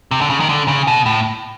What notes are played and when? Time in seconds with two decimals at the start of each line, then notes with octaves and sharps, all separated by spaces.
0.11 C3
0.21 D3
0.30 C#3
0.40 D#3
0.49 D3
0.68 C#3
0.87 B2
1.06 A2